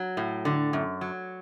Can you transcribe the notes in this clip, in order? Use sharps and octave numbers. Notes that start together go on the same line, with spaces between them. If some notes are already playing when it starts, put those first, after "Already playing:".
Already playing: F#3
A2
D3
F#2
F#3